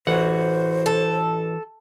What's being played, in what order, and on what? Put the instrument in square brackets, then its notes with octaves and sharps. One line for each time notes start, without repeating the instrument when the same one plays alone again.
[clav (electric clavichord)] A1 F#5 [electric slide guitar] E3 F#4 [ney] C5
[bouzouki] A4